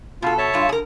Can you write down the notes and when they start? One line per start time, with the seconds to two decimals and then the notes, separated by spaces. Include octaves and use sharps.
0.22 B2 F4 A4
0.38 C#5 E5 A5
0.54 G2 F4
0.69 G#4 A#4